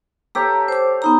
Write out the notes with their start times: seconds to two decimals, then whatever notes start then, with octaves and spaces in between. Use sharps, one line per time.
0.35 G4 A4 C#5 A#5
0.68 C5 D6
1.02 B3 D#4 A#5